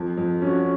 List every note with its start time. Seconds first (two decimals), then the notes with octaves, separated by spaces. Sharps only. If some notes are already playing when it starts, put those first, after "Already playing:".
Already playing: F2
0.17 F2
0.41 C#4 F#4